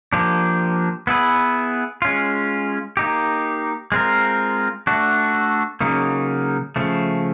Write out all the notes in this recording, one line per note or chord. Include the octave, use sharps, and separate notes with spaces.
F3 A#3 D4 G4
B3 E4 G#4 B4
G#3 C#4 F4
A#3 D#4 G4
G#3 C4 F4 A#4
A3 D4 F#4
C#3 F#3 A#3 D#4
C#3 F3 A3